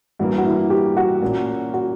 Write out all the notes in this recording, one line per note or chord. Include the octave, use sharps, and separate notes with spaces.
G2 E3 A#3 F#4
F#4
E4
G4
F#4
A#2 A#3 C#4
F#4